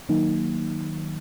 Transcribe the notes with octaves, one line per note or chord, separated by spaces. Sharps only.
D#3 F#3 A#3 D#4